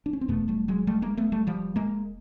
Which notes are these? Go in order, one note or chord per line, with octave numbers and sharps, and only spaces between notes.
D4
C#4
C4
E1 E2 B2 A3 B3
G3 A3
F#3 G#3
G3 A3
G#3 A#3
A3 B3
G3 A3
F3 G3
G#3 A#3